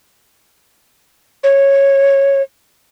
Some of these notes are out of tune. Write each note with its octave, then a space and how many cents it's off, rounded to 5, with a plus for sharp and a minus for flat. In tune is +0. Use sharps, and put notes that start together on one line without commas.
C#5 -10